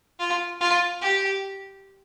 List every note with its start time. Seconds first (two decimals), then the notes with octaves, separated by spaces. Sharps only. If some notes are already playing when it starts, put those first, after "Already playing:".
0.20 F4
0.61 F4
1.02 G4